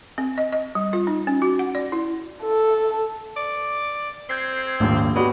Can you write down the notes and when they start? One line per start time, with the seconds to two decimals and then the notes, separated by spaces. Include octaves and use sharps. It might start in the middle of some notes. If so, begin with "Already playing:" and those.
0.18 C4
0.38 D#5
0.52 D#5
0.75 G3
0.93 F4
1.07 D#4
1.27 C#4
1.42 F#4
1.59 F#5
1.75 D5
1.92 E4
2.43 A4
3.37 D5
4.29 C4 G6 G#6 C7
4.80 D#1 A#1 G#2
5.16 G#3 B3 F#4 G4 C#5 D5